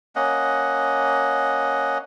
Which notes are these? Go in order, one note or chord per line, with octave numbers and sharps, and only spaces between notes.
A#3 C#4 D#5 F#5